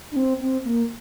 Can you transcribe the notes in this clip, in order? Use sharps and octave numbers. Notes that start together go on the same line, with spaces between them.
D4
C4
C4
A#3